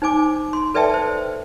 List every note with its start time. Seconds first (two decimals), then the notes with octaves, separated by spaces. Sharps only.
0.02 D#4 C5 G#5 D6
0.53 C6
0.74 A4 B4 D5 E5 G5 A5
0.94 C5